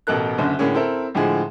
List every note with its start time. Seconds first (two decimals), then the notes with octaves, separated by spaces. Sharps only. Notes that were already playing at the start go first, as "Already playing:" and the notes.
0.07 A1 B2 A4 A#4 F#6
0.38 F#1 F#2 D3
0.59 A2 D3 A#3 C#4 G#4
0.75 C4 E4 A4 A#4
1.14 A2 D3 F3 G#3 G#4